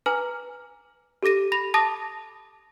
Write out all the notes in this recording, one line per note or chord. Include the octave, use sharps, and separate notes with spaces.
B4 G#5 A#5 D6 F6
G4 A4 D6 A#6 D#7
B5 A#6 F7
A5 D6 D#6 A6 A#6 D#7